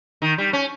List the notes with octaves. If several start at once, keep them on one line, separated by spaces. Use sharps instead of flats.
D#3
G3
C#4